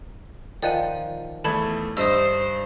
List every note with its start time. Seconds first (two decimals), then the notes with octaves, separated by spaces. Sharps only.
0.62 D#3 F3 D5 F#5 G#5
1.44 E2 A3 A5 B5 G#6
1.97 G2 C5 D#5 D#6 E6